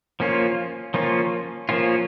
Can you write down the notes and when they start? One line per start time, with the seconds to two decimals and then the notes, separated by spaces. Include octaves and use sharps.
0.20 F3 A#3 C#4 F4
0.94 F3 A#3 C#4 F4
1.69 F3 A#3 C#4 F4